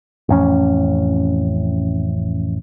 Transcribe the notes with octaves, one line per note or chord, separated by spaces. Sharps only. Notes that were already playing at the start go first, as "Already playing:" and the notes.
A1 F2 C#4